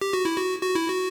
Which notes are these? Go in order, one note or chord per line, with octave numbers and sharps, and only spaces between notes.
G4
F#4
E4
F#4
F#4
E4
F#4